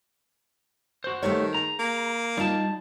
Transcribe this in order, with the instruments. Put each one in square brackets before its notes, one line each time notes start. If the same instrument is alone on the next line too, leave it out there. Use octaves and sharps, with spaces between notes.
[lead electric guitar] F#4 C5
[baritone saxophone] D#3 [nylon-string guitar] A3 G4 C#5
[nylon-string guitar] G#4 [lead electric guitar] A#5
[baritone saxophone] A#3
[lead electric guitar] G3 A5 [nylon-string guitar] D#4 F4